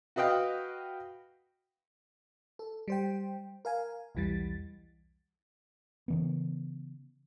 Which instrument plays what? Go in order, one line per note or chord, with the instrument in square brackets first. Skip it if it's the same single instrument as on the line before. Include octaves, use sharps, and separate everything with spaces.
[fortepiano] F#4 B4 D#5 F5 G5
[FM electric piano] A4
G3 C5 G5
A#4 F5 G#5
B1 E2 E3 G3 A6
[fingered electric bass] C#3 E3 B3